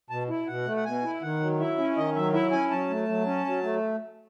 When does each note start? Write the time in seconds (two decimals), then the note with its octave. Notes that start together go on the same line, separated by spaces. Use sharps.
0.10 B2 A5
0.29 E4
0.47 B2 F#5
0.66 A3
0.77 F#5
0.85 B2 G#5
1.04 E4
1.22 D#3 F#5
1.40 F#3
1.59 E4 E5
1.78 C#4
1.96 D#3 D#5
2.15 F#3 E5
2.33 E4 E5
2.52 C#4 G#5
2.71 F#3 A5
2.90 A3
3.08 F#3
3.26 C#4
3.46 F#3
3.63 A3